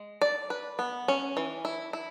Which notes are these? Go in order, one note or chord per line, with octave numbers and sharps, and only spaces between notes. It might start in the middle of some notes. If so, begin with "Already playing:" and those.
Already playing: G#3
D5
B4
B3
C#4
E3
E4
E4